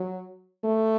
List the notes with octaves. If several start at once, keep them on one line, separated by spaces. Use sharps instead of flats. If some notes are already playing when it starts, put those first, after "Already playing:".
Already playing: F#3
A3